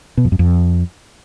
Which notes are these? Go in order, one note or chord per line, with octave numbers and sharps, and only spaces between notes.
B2
F2
F#2
F2